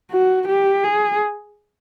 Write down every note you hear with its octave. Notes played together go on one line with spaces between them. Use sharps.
F#4
G4
G#4